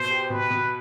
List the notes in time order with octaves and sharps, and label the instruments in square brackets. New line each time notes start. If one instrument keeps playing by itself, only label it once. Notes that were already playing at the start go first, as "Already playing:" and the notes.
Already playing: [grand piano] B2 [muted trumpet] C5
[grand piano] G4
[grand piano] B2 [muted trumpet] B4
[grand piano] B2